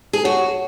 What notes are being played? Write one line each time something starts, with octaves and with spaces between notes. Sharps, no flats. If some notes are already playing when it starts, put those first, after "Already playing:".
G#4
F#4 A4 C#5 F#5 A5